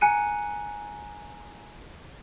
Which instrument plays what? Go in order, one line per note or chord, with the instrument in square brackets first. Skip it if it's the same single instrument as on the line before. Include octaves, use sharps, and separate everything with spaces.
[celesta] G#5 A#5 F#6 C#7 D#7